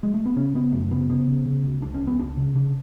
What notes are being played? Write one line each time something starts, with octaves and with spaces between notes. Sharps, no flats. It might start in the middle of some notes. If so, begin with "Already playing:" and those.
G#3
A3
B3
C#3 C#4
C#3 B3
F#2 A3
C#3 B3
C#3 B3
C#3
C#3
D2
C#2 D4
C#4
C#2
B3
C#2 D4
C#3
C#3 D4